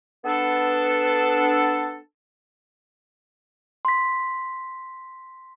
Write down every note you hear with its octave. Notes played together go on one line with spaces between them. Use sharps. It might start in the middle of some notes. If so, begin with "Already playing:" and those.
B3 D4 A4
C6 B6